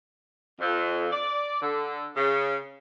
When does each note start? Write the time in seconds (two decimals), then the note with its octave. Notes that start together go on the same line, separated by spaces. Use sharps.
0.60 F2
1.11 D5
1.61 D3
2.16 C#3